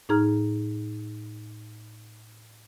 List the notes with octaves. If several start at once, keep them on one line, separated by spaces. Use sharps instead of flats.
A2 D#4 G#4 A#5 F6